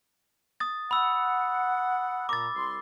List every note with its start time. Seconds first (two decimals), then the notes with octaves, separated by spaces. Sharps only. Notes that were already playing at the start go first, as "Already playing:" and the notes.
0.60 D#6 A6
0.91 F#5 B5 E6
2.29 A#2 A#5 D6 A6
2.55 C2 G3 C6